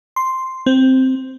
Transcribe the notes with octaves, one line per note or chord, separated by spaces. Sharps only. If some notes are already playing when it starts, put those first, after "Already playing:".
C6
C4